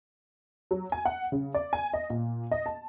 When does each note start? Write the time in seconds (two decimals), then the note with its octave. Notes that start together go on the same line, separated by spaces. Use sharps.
0.71 F#3
0.92 G#5
1.05 F#5
1.32 C#3
1.54 D5
1.73 G#5
1.94 D#5
2.10 A#2
2.51 D#5
2.66 A5